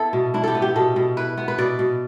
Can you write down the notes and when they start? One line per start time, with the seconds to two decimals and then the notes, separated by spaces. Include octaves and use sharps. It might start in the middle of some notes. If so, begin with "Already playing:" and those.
Already playing: B3 E4 A4
0.13 B2
0.34 D4 E4
0.44 G4 A4
0.55 B3
0.62 G4
0.76 B2 A4
0.96 B2
1.17 E4 B4
1.38 B3
1.48 B4
1.58 B2 D5
1.79 B2